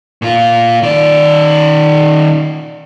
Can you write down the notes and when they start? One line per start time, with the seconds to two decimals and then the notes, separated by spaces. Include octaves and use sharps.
0.22 A#2 F4
0.82 D#3 D5